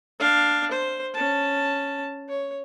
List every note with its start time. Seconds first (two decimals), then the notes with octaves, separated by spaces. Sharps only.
0.20 D4 F5
0.71 C5
1.14 C#4 A5
2.28 C#5